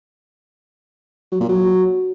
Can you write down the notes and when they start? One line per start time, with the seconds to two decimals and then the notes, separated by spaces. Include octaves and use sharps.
1.32 F#3
1.40 A#2
1.49 F#3